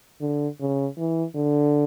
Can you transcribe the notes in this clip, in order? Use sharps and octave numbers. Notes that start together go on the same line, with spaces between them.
D3
C#3
E3
D3